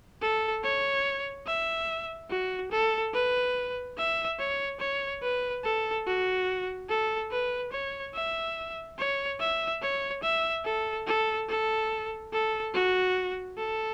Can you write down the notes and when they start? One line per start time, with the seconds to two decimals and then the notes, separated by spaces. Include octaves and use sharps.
0.22 A4
0.63 C#5
1.46 E5
2.30 F#4
2.71 A4
3.14 B4
3.98 E5
4.39 C#5
4.80 C#5
5.22 B4
5.64 A4
6.06 F#4
6.89 A4
7.31 B4
7.72 C#5
8.14 E5
8.99 C#5
9.40 E5
9.82 C#5
10.23 E5
10.65 A4
11.07 A4
11.49 A4
12.33 A4
12.74 F#4
13.58 A4